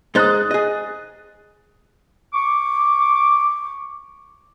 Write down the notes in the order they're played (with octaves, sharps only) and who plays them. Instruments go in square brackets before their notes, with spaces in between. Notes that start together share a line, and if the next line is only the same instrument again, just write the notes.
[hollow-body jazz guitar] G#3 D#4 C5 [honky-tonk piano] D#6 F#6 A6
[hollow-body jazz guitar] G#4 D#5
[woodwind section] C#6 D6